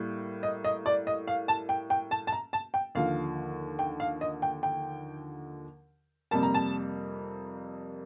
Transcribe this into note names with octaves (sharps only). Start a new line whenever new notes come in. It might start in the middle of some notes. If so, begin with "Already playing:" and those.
Already playing: A2 G3 A#3
D#5
D#5
D5
D#5
F5
A5
G5
G5
A5
A5
A#5
A5
G5
D#2 D3 F3 F5
G5
F5
D#5
G5
G5
F2 C3 G3 A#3 A5
A#5
A5